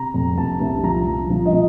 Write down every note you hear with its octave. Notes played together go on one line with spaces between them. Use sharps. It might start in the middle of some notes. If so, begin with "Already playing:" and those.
Already playing: C3 A#5
F2
C2 A5
C2
F3 A#5
F3
F3
D#5
F3